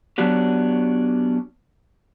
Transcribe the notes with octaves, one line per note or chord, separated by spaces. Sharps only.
F#3 B3 C#4 D4 F#4 G4